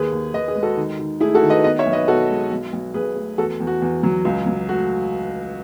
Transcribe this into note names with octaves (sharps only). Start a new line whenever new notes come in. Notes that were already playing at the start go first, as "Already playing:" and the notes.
Already playing: D#2 G#4 B4
D#2
D#2 B4 D#5
G#4 B4
G#3
F#4 A4
D#3
D#3
A3 E4 G#4
F#4 A4
D#3
B4 D#5
B3 B4 D#5
C#5 E5
B1
B4 D#5
B2 F#4 A4
G#3
B1
B1
B1 G#4 B4
A3
E2 F#4 A4
E2
F#4
E2
F#3
C#2
F#3
A3 F#4